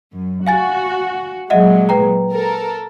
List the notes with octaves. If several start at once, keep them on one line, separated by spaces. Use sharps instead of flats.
F#2
F#4 F5 G#5 A6
A#2 F#3 G#3 D#5 E5 F#5
B4 G5 A#5
A4 A#4